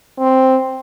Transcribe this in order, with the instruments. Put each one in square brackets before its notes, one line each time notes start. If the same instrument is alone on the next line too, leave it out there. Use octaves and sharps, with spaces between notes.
[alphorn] C4